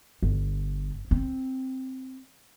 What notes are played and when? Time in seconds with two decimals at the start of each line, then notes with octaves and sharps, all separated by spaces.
0.23 G1
1.11 C4